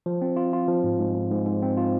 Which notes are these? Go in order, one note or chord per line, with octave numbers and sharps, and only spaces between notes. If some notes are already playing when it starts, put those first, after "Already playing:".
F3
C4
F4
F4
F3
G#2
G#2
G#2
G#2
G#2
C4
F4